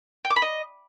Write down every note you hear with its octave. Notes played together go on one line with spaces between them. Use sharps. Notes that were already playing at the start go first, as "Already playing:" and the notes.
G5
D6
B5
D#5